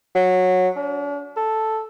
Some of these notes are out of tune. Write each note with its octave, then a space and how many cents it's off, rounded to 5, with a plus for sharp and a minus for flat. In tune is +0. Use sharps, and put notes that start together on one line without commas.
F#3 -15
D4 -45
A4 +0